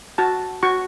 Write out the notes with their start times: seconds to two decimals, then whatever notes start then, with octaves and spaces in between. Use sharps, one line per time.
0.18 F#4 A5
0.63 F#4 C#6